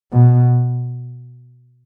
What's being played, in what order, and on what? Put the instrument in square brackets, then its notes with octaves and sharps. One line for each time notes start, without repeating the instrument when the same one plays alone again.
[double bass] B2